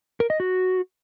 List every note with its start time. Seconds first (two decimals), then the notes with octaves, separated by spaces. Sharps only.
0.20 A#4
0.30 D#5
0.40 F#4